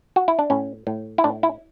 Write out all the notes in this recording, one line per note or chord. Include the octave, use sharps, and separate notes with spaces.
F#4
E4
D4
A2 C#4
A2
E4
A2 D4
E4